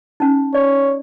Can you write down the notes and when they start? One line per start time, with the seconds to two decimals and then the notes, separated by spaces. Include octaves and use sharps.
0.20 C#4 D#4
0.54 C#5 D5